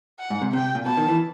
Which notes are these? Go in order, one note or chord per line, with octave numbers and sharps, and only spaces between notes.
F#5
G#2
C3
C3 G5
A#2
B2 A5
D#3
E3